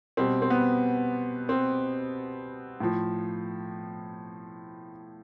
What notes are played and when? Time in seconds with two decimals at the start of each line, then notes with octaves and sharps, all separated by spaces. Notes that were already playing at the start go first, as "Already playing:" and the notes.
0.17 B2 G3 C4
0.42 C4
0.50 B3
1.49 C4
2.80 A2 F3